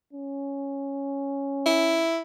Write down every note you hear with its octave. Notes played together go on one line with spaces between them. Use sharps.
C#4
E4